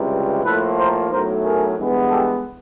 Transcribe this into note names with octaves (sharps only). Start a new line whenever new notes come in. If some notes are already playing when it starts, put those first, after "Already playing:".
Already playing: C#2 C3 E3 G3
A2 F3 A#3 A4 B4
A#4 C5
B1 A2 F#3 A3 A#4 C5
G#4 A#4
G2 E3 G#3 B3
G4 A4